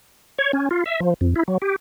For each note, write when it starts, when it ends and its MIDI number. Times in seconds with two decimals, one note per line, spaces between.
0.38 0.52 73
0.53 0.69 61
0.71 0.84 65
0.86 1.00 76
1.00 1.14 53
1.21 1.34 41
1.36 1.43 64
1.48 1.58 54
1.62 1.76 67